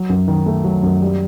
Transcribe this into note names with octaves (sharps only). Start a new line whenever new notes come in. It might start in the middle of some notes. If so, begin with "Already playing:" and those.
Already playing: F#3
F#2
D#3
A3
F#3
F#2
G3